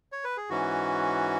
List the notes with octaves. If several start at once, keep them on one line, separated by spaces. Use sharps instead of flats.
C#5
B4
G#4
G#2 E3 C#4 F#4